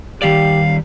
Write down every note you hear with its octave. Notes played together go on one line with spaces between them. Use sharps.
D#3 G3 G4 D5 F5